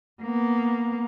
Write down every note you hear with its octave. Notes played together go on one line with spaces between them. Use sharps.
A#3 B3